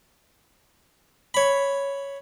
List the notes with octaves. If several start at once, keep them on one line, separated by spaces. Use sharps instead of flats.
C#5 B5